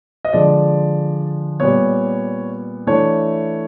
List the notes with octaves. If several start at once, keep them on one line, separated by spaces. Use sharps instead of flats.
D#5
D3 F3 G#3 D5
A#2 G3 B3 C#5
E3 A3 D4 C#5